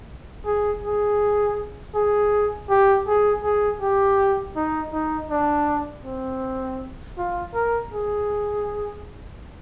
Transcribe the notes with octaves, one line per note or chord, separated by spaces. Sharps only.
G#4
G#4
G#4
G4
G#4
G#4
G4
D#4
D#4
D4
C4
F4
A#4
G#4